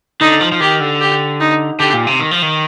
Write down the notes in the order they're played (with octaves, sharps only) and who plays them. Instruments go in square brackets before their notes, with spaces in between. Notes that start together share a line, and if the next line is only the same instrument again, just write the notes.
[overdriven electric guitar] D3 [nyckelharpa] D#4
[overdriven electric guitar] F3
F3
[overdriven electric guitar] D#3 [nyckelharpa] G4
[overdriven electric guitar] D3
[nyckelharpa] G4
D#4
[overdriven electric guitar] D3 [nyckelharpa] G4
[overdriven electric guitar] A#2
C3
D#3
F3
D#3